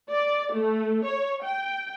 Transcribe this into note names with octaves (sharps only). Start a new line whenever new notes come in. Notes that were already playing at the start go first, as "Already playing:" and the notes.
D5
A3
C#5
G5